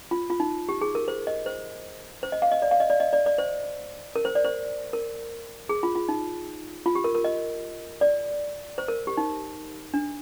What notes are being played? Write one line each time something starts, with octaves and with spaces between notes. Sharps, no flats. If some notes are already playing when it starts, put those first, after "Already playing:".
F4
F4
D#4
G4
G#4
A#4
C5
D#5
C5
C5
D#5
F5
D#5
D5
F5
D#5
D5
D#5
D5
D5
C5
A#4
C5
D5
C5
A#4
G#4
F4
F4
D#4
F4
G4
A#4
A#4
D#5
D5
C5
A#4
G4
D#4
D4